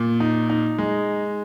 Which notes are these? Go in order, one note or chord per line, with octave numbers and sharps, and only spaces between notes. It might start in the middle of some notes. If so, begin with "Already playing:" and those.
Already playing: A#2
D#4
D#4
G#3